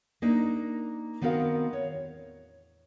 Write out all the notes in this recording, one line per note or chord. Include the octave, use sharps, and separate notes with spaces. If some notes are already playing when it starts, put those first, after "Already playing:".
A#3 D4 D#4 A#4
D#3 B3 C4 F#4 A#4 F5
C#5